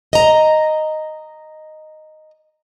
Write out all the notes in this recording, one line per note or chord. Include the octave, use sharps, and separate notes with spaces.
D#5 A#5